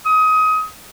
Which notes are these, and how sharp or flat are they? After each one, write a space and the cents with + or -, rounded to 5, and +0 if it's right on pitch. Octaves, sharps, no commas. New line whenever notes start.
D#6 +25